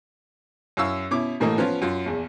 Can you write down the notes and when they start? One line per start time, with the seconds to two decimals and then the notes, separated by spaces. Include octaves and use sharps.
0.77 F#2 E4 F5 C#6 E6
1.11 B2 C#4 E4 D6
1.40 A1 A2 E3 A#3 A4 D#5
1.58 F3 B3 C#4 F4
1.82 F#2 F4
2.06 A#1 E2